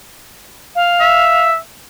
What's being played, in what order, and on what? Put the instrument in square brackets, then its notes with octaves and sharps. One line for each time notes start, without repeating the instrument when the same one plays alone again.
[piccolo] F5
[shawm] E5